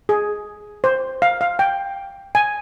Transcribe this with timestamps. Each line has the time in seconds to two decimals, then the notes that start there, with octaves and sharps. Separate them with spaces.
0.09 G#4
0.84 C5
1.22 F5
1.41 F5
1.59 G5
2.35 G#5